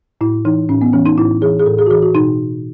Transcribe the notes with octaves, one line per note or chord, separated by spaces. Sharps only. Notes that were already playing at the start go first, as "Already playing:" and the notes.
A2 E4
E3 D#4
A2 C#4
B3
E3 C#4
D#4
A2 E4
E3 G#4
G#4
A2 A4
G#4
F#4
E3 G#4
F#4
B2 D#4